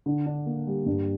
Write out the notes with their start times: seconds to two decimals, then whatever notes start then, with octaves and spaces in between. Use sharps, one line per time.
0.06 D3
0.26 D4
0.46 A#3
0.67 G3
0.86 G2